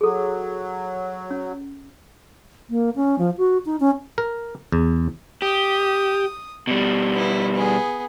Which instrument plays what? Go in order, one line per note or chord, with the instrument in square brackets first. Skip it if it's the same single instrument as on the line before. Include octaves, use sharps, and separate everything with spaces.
[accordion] F#3 [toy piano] G#4 A4
[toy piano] C#4
[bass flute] A#3
C#4
F3
F#4
D#4
C#4
[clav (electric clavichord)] A#4
E2
[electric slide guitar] G4 [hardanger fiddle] D#6
[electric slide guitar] B2 G3
[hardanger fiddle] B3 E4
B3 G#4